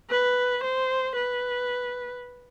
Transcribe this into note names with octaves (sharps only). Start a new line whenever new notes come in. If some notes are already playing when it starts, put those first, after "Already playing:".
B4
C5
B4